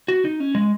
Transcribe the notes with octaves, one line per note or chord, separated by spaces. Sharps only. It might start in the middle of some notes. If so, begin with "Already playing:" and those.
F#4
D#4
C#4
G#3